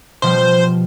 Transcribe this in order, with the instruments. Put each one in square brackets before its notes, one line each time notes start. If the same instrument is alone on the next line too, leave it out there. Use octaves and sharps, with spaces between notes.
[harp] B2 F3 G3 [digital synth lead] C5